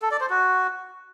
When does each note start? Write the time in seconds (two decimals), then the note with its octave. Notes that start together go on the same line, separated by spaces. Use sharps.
0.02 A4
0.11 D5
0.21 C5
0.30 F#4